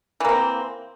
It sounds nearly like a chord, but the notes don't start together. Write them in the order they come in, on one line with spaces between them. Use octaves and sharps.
E3 A#3 C4